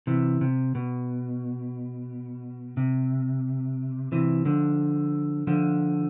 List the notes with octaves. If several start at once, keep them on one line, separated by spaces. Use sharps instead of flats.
C3 E3
C3
B2
C3
C3 E3
D3 F3
D3 F3